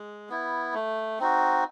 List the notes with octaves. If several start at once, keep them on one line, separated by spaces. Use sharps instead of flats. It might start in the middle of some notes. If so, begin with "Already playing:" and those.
Already playing: G#3
B3 E4
A3
C4 D#4 F#4